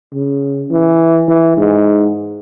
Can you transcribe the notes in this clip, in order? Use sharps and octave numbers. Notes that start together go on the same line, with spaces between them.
C#3
E3
E3
G#2